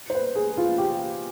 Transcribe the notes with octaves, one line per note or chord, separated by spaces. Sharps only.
C5
B4
G#4
F4
G4